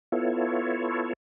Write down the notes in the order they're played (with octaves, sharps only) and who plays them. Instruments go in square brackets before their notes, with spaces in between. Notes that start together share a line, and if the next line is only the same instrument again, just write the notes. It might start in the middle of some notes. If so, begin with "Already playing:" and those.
[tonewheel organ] B3 E4 F4 A4 C#5